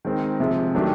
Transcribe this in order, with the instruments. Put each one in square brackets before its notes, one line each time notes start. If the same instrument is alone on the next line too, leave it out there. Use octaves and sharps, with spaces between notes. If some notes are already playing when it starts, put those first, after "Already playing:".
[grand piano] D#3 G#3 C4 D#4
C3 F3 G#3
D#3 F#3 A3 D4 G4